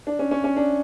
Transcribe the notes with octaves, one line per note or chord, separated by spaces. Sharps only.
D4
C#4
C#4
C#4
D4